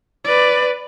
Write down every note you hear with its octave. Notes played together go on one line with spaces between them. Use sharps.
B4 D5